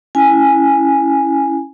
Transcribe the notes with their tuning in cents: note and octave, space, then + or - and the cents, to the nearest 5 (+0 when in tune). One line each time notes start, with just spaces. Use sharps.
C#4 +0 E4 +0 G#5 -5